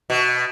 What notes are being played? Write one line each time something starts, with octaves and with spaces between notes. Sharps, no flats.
B2